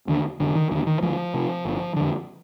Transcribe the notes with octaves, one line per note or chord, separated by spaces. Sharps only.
D#2 D3
F1 D3
D#3
D#2 D3 D#3
D#3
D2 F3
C3
G1
F2 D3